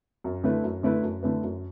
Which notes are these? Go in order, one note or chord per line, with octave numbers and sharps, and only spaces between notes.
F#2
D3 A3 E4 B4
F#2
D3 A3 E4 B4
F#2
D3 A3 E4 B4
F#2